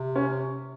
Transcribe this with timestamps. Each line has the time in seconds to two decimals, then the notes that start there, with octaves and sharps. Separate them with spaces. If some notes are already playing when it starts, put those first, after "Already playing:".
Already playing: C3
0.16 C#4